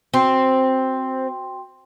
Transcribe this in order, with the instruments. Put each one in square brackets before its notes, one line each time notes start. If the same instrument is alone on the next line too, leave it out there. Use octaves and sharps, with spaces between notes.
[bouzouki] C4 [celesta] F#4 G5 C6